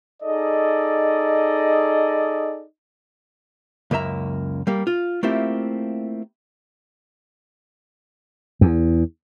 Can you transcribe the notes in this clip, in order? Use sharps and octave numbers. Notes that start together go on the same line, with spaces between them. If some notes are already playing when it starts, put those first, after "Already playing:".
D#4 G#4 A4 D5 D#5
C#2 F#2 A#3 E5 A#5
G3 A#3
F4
A3 A#3 C4 E4 F4 G4
E2